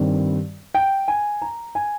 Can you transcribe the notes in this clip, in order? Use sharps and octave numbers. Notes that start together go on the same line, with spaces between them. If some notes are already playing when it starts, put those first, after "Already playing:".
Already playing: G2 D#3 G3 C4
G5
G#5
A#5
G#5